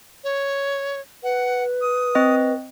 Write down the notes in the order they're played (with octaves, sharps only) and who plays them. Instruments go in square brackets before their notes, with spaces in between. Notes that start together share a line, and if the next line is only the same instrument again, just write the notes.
[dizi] C#5
[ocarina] B4 [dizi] F#5
[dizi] D#6
[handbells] C4 D#5